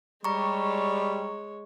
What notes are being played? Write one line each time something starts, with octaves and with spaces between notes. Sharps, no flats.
G3 G#3 C#5 A#5 C#6